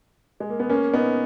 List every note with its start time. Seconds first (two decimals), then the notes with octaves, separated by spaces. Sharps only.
0.40 G#3
0.50 A#3
0.60 B3
0.69 A#3 C#4
0.93 B3 D#4